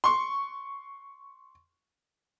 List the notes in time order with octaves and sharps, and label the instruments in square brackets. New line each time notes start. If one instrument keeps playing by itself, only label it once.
[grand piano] C6 C#6